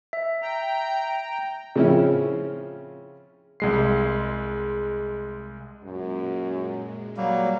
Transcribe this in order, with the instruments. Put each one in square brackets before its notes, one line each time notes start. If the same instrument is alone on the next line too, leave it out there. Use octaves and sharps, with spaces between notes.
[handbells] E5
[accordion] G5 A#5
[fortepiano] C#3 F3 C4 C#4 E4
[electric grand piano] C2 G#3 C7
[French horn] F#2 [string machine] A#2 G#3
[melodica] F#3 A#3 [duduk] G3